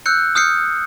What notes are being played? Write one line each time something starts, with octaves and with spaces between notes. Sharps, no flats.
E6 F#6 G6 C#7
D#6 F6 G6 C7 C#7